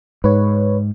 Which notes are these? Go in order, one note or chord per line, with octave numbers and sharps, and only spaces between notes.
G#2 B4 C#5